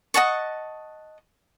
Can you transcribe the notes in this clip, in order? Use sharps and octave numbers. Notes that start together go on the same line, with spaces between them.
D#5 F#5 A5 C#6